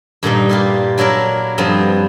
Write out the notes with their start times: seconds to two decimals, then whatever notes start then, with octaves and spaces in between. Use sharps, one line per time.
0.23 G2 A#2 G3 D#4
0.49 E4 F4 G4
0.98 F#3 D4 E4 A#4 E5
1.58 G2 F3 B3 C4